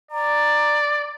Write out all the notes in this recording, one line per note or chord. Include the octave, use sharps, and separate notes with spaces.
D5 A#5